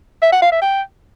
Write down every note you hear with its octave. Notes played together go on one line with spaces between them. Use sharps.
E5
F#5
F5
E5
G5